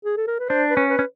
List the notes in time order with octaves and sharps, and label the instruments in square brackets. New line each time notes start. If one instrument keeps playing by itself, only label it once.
[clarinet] G#4
A4
A#4
B4
[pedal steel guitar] D4 [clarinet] C5
[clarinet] B4
[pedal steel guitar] C#4
[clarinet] B4
[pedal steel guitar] C#4